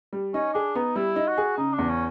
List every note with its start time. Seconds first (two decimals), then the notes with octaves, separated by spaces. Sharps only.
0.13 G3
0.34 C#4 D#4
0.54 D4 G#4
0.75 B3 D#4
0.96 G3 E4
1.16 D#4
1.27 F#4
1.37 G#4
1.57 C#3 D#4
1.73 D4
1.78 E2
1.89 C#4